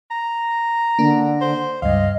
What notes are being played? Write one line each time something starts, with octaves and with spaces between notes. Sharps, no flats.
A#5
D3 A#3 D4
C5
C#2 G2 D#5 F5